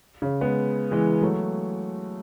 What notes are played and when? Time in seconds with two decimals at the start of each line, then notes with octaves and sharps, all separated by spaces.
0.22 C#3
0.41 G#3 B3
0.91 E3 G#3
1.22 F#3 A3